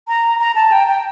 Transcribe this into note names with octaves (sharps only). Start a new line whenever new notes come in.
A#5
A#5
A5
G5
G5